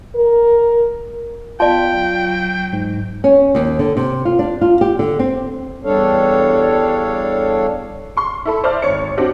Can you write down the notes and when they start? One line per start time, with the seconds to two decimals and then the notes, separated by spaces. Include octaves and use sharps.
0.16 A#4
1.60 B3 F4 D5 G5 A5
1.95 F#3
2.73 G#2
3.24 C#4
3.55 D#2
3.79 D3
3.97 C3
4.25 F4
4.39 D4
4.61 F4
4.81 G4
4.99 D3
5.19 C4
5.84 E2 G3 D4 A4 C#5 F5
8.17 C6 C#6
8.45 E4 A4 B5
8.64 C5 D5 E5 A5 D6 F6
8.82 G#1 C#5 C#7
9.18 C4 D4 F#4 G4